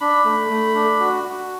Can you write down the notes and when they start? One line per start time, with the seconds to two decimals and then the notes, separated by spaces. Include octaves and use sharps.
0.01 D4 B5
0.25 A3
0.50 A3
0.75 D4
1.00 F#4
1.24 F#4